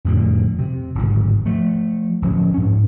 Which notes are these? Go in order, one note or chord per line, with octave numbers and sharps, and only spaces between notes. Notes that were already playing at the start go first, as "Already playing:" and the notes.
F2 A2 D3 G3
C3
D1 G#1 G#2
F3 A3
D1 F3 C#4
G#2 C#4